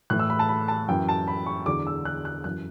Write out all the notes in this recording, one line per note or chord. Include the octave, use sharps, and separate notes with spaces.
A2 E3 F#6
E6
B5
A5
B5
A5
F#2 E3 G5
A5
B5
C#6
E2 D3 F#3 D6
E6
F#6
F#6
F#2 E3 F#6